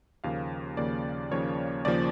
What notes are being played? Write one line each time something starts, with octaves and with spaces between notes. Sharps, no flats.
D#2 C#3 F3 A#3 F5
D#2 C#3 F3 A#3 D5
D#2 C#3 F3 A#3 C#5
D#2 C#3 F3 A#3 D5